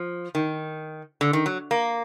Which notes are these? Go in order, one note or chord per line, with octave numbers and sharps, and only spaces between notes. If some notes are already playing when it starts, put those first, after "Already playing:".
Already playing: F3
D#3
D3
D#3
F#3
A#3